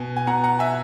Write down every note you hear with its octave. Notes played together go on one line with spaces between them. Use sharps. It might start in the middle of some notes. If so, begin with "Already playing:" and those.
Already playing: B2 G#5
G#5
B2 F#5 A#5
F#5 A#5
E5 G#5